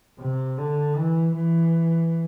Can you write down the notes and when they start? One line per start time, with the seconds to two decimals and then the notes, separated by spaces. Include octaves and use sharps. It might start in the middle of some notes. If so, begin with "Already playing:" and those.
0.20 C3
0.58 D3
0.97 E3
1.36 E3